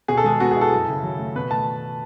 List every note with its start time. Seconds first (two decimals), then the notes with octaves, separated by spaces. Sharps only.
0.08 B2 G#4
0.17 A4
0.24 G#3 G#4
0.40 B3 F#4
0.51 G#4
0.56 E4 A4
0.72 F#2
0.89 C#3
1.03 F#3
1.19 A3
1.36 B2 B4
1.51 A3 A5